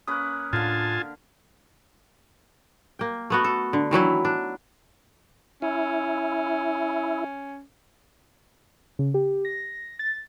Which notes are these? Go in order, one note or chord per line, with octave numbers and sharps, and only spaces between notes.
A#3 C#4 B4 D#6 F#6
A2 D3 D4 F4 F5 G#5 A5
A#3 G5
A3 B3 F#4
A4
D3
D#3 E3 F#3 E4
D4
C#4 E4
C#3
G4
A#6
A6